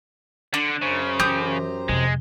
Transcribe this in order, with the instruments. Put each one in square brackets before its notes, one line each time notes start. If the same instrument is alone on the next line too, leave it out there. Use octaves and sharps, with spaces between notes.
[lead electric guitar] D3 [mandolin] D4
[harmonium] F#2 C5 A#5 [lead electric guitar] C#3
[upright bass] E3 [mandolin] G4 D#6 G6
[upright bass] F2 C3 [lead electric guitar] G#3